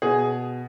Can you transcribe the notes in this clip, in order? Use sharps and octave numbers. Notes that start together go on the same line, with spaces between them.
B2 G#4